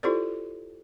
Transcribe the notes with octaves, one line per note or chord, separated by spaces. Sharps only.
E4 F4 G4 A4 C5 D5